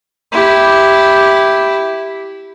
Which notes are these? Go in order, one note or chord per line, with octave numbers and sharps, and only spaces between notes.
E4 G4